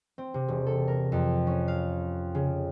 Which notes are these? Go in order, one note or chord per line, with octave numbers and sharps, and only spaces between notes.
C4
C3
E1
A4
A#4
F2
C#4
F5
C#3